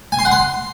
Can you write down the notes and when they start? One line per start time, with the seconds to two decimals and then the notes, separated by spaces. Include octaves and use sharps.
0.12 G#5
0.19 C6
0.25 F#5
0.31 C6